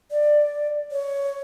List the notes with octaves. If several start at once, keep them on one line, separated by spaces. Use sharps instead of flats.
D5
C#5